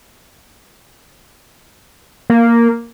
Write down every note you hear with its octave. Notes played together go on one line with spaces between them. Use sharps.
A#3